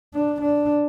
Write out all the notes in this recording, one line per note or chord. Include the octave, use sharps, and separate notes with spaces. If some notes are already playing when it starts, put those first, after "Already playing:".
D4
D4